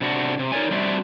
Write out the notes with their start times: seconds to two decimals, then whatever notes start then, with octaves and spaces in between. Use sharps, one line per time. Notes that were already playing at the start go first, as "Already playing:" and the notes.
0.01 C3 D4 F#4
0.39 C3
0.52 D#4 A#4 C#5 D5 G#5
0.71 G3 A3 C4 D4 F#4 E5